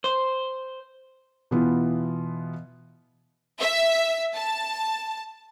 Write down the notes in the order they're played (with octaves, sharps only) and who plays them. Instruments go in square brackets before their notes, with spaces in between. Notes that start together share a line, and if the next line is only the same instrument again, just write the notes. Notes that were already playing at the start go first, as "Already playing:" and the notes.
[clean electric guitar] C5
[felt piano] B2 E3 B3 E4 F4
[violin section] E5
A5